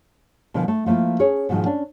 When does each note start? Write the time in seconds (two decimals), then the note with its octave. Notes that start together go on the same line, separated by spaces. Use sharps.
0.54 B2 D3 E3 F3 A#4
0.68 A3
0.86 F3 A3 A#3 E4 F4
1.19 C#4 G#4 C#5
1.49 G#2 B2 D#3 F3 G#3
1.66 C#4 D4